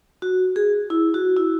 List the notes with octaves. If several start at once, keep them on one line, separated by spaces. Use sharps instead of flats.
F#4
G#4
E4
F#4
E4